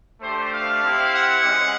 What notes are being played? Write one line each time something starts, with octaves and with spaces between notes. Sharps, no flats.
A3 D4 G4 C5
F5
C4 E4 G4
F#5
G#3 C#4